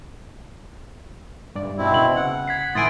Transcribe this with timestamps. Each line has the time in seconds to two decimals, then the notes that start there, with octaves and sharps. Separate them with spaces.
1.55 D2 G2 D5
1.78 B2 C4 E4
1.94 C#3 F#7
2.16 F#5
2.48 G#6 B6 C7
2.75 A2 E3 E4 G#5 C6 D#6 A6 D7